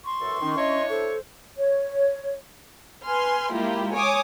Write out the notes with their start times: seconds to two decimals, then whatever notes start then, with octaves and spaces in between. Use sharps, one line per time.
0.06 C6 C#6
0.21 F#2 E3 A4
0.41 D#3 C#4 D#4
0.57 D4 E4 C#5 D#5
0.90 A4 C5 C#6
1.58 C#5
3.04 B4 G#5 C6 F6
3.52 G#3 A#3 E4 F4 G4
3.93 C#5 G#5 D6 D#6